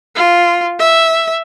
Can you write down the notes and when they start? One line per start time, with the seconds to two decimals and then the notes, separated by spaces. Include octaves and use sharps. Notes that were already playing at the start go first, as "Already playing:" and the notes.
0.16 F4
0.79 E5